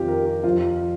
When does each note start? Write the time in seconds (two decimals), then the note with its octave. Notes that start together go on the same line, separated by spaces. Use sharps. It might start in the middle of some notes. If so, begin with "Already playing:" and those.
Already playing: F2 C3 D#3 F4 G4
0.08 A#4
0.26 G4
0.44 F2 F3 F4